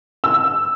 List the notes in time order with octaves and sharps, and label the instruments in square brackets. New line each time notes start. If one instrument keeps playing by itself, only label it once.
[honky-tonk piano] E6